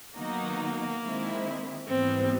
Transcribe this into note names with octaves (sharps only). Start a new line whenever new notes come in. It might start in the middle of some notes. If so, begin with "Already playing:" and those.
D#3 F#3 A#3 B3 D#4 F#4
D#3 G#3 C4 E4
G#2 E3 G3 B3 C4